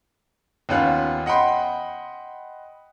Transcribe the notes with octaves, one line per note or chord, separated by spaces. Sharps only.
D#2 B3 C#4 F4 F#6
D#5 F#5 G5 B5 C6